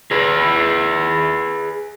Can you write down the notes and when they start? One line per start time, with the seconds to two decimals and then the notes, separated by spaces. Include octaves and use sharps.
0.11 G#4 B4